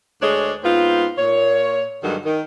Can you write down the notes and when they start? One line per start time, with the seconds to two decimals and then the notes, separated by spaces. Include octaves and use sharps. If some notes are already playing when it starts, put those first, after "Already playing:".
0.22 D2 G#3 D4 G#4 C#5
0.64 G#2 B3 C4 F4
1.18 A#2 C#5
2.03 G2 D3 D#3 F#3 G#3
2.25 D#3